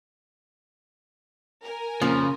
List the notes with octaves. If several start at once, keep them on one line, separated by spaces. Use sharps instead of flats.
A#4 G#5
F2 A#2 C#3 F3